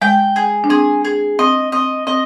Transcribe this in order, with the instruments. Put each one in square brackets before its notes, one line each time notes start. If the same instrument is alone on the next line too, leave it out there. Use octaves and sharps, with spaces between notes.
[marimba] G#3 [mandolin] G5
[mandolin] G#4
[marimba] D4
[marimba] C4 [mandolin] G#4
[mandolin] G#4
[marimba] C4 [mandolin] D#5
[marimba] C4 [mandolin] D#5
[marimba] C4 [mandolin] D#5